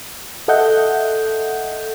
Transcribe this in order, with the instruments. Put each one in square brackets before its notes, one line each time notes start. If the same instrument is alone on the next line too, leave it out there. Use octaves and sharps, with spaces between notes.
[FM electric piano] A4 D#5 E5 F#5 G6